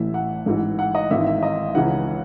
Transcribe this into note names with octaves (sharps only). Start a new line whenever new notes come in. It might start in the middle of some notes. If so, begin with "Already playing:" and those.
Already playing: A1 A2 E3 E5
F#5
A1 G#2 E3
F#5
D#5
G#1 G#2 E3 E5
E5
D#5
C#2 C#3 E3 F#5